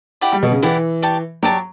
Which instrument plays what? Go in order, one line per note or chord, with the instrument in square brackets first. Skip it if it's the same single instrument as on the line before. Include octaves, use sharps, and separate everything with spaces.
[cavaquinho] E4 G4 D5 F#5
[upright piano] G3
B2
C#3
[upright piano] E3 [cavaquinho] E4 G4 D5 F#5
[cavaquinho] G4 D5 A5 C#6
[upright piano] F#3 [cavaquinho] G4 D5 A5 C#6